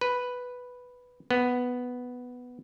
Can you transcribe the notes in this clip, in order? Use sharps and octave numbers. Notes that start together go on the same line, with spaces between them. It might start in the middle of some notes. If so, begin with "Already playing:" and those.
B4
B3